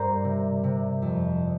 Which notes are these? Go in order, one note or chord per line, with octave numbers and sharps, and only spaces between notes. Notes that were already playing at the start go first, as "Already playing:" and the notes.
Already playing: G2 A#4 C5 D5
C3
C3
F2